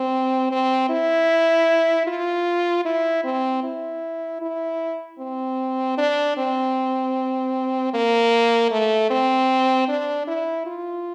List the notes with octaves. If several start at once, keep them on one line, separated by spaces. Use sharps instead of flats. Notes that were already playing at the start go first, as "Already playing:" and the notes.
Already playing: C4
C4
E4
F4
E4
C4
E4
E4
C4
D4
C4
A#3
A3
C4
D4
E4
F4